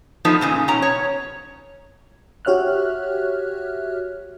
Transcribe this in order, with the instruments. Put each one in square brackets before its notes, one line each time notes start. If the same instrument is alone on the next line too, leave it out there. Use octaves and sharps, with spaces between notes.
[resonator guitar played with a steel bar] F3 A3 B3 D#4
A#2 C#3 D#4
B2 C#4 A#5
C#5
[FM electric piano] F#4 G4 C#5 E5 F6 F#6